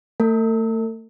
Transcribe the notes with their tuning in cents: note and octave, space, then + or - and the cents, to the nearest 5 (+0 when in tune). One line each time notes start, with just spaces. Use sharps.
A3 +30 A4 +45